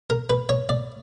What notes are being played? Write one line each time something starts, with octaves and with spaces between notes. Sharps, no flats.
A#4
B4
C#5
D5